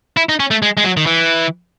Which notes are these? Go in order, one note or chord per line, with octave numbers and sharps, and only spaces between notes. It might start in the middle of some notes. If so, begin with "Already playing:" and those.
E4
D#4
C#4
A3
G#3
G#3
F#3
D#3
E3